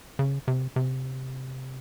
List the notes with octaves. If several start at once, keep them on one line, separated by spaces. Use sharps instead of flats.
C#3
C3
C3